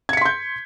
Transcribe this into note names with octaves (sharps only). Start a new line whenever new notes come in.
C6 G6 G#6 B6 C#7